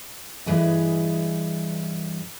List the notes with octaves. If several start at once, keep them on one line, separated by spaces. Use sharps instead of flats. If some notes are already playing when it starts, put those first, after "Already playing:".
G2 E3 G#4 B4 D#5